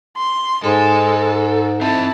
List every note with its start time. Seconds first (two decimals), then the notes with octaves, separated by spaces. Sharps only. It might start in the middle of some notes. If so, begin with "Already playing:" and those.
0.17 C6
0.64 G#2 G#3 A4
1.81 C4 E4 D#5 A5